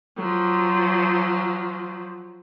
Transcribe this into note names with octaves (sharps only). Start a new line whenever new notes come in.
F3 F#3